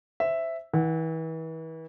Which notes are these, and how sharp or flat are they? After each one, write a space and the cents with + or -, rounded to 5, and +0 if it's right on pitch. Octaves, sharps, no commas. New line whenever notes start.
C5 +5 E5 +0
E3 -35 F#5 +0